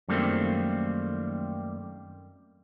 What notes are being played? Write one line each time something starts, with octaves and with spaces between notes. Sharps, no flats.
F#2 D#3 G3 A3 A#3 C4